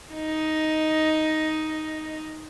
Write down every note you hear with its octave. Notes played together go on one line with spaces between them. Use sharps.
D#4 D#5